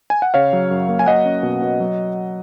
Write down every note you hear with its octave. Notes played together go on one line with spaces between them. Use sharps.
G#5
F#5
C#3 C#5 F5
F#3
F#2
A#3
G#5
F#3 D#5 F#5
C#4
B2
B2
F#3